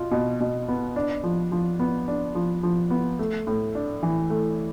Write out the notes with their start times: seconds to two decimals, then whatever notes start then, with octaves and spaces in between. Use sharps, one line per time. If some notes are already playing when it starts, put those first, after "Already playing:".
Already playing: B2 F4
0.11 B2
0.40 B2
0.68 B3
0.96 D4
1.24 F3
1.52 F3
1.79 B3
2.08 D4
2.35 F3
2.63 F3
2.90 B3
3.19 A3
3.47 A2
3.75 D4
4.03 E3
4.30 A3